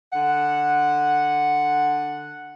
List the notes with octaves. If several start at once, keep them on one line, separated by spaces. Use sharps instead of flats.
D3 F#5